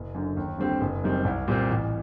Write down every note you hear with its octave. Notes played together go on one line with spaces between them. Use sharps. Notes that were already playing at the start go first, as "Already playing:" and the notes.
Already playing: F#1
F#2 D3
D#2
D3 G3 C4 G4
F#1
F#2 D#3 G3 C4
C2
A#2 G3 C4
A1